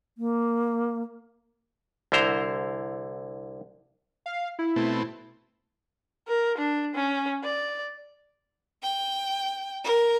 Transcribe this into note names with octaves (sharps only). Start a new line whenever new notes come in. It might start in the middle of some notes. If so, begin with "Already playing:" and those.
A#3
C2 D3 E4 C5 A#5
F5
E4
B2 A3 C4
A#4
D4
C#4
D5
G5
A#4